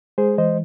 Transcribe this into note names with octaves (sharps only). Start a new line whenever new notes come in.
G#3 G#4 C5
E3 C5 D#5